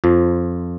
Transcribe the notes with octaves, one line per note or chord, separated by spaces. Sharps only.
F2 F3